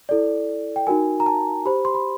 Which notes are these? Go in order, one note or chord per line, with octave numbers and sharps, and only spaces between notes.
E4 A4 D5
G5
D#4 F#4 A#4 G#5
A#5
A5
G4 C5 B5
C6
B5